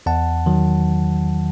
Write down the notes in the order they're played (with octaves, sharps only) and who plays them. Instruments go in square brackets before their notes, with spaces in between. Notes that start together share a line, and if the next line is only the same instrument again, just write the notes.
[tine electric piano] E2 F#5 A5
D#3 F#3